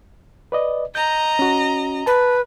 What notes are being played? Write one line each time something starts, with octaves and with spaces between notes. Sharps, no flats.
B4 D5 D#5
D#5 A#5 G6
C#4 F#4
B4 A5